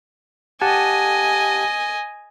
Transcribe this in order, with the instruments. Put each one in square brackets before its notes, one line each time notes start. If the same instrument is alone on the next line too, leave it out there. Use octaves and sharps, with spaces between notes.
[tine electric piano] G4 F#5 A5 [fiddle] D#5 G#5